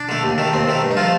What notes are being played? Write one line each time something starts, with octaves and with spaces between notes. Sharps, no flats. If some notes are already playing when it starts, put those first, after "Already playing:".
Already playing: D4
D3 A3
D#2
D#3 A3
D#2 C4
D#3 A3
G2
D#4
F3 A3 F4